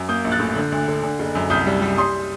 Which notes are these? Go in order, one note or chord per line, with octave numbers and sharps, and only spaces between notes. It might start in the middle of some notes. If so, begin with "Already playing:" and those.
Already playing: F#2
A#3 D#6 G6
A#1
F#6 A6
A2
D3
D2
D3
D3
F#1
F#2
C2 D#6 G6
G3
G3
G3 C6 D#6